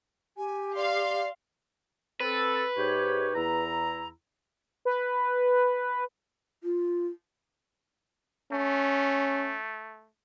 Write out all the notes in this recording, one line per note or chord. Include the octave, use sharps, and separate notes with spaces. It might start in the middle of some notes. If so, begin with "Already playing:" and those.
G4 G#5
D5 F5 C6
C4 A4 B4
G#2 G4 C#5
E2 E4 A#5
B4
F4
A3 C#4